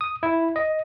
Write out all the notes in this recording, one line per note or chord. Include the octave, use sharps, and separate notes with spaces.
D#6
E4
D#5